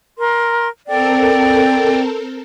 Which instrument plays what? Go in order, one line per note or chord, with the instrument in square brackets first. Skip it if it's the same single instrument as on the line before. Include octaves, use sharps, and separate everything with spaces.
[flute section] A#4 C6
[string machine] C4 A4 A#4 [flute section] D5 G5